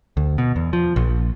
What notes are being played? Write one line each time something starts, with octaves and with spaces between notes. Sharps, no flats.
D2
B2
E2
F3
A#1